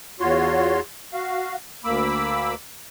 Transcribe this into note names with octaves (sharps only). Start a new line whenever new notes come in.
E2 F4 F#4 C#5 C6
F#4 F5
D2 A#3 B5 D6 E6